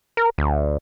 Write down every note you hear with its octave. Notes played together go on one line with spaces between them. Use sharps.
A#4
D2